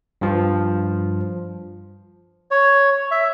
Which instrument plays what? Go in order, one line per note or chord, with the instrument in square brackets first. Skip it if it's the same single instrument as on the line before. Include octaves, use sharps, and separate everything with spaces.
[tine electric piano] G2 F3
[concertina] C#5
E5